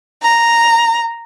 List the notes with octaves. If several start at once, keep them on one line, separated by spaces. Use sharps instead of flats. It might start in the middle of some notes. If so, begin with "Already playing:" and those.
A#5